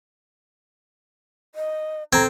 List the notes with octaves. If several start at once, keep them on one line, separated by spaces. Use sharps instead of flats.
D#5
C4 A4 A#5 G#6